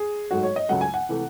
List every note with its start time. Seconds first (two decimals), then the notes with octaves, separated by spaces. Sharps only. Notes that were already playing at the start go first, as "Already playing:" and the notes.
Already playing: G#4
0.31 G#2 F#3 A3 F#4
0.43 C#5
0.56 D#5
0.68 C#2 C#3 F#3 A3 F#5
0.81 G#5
0.94 F#5
1.09 C3 E3 A3